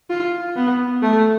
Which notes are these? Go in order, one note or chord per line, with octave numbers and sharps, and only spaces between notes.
F4
B3
A3